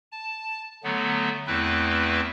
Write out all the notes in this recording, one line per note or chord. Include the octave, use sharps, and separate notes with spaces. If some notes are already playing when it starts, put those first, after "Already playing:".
A5
D3 F#3 A3 B3
E2 A3 C4 E4 B4